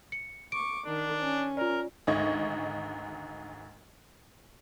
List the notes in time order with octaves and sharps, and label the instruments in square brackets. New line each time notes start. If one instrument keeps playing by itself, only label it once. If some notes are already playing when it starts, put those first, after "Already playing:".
[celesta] C#7
[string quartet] C#6 D6 [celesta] D7
[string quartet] D#3 [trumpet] D4
[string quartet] C#4
[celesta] F4 D5 [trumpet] A#4
[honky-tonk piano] G#1 D2 G#2 D#5 C#6 G#6